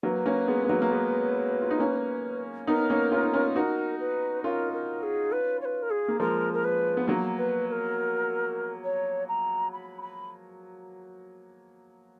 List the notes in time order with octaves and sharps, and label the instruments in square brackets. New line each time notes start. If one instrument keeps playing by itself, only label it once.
[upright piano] F#3 A#3 [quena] B4
[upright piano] A#3 C#4
G#3 B3
B3
F#3 A#3
A#3
G#3 B3
F4
D#4
A#3 C#4
[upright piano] B3 D#4 [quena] A#4
[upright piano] A#3 C#4
C#4 F4
D#4
C#4 F4
[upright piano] D#4 F#4 [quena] A#4 B4
[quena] B4
[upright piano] C#4 F4 [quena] A#4
[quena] A#4
G#4
B4
C#5
B4
A#4
G#4
[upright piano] A#3
[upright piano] F3 G#3 [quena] A#4
[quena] A#4
B4
[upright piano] B3
F#3 A#3
[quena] B4
B4
A#4
C#5
A#5
B5
B5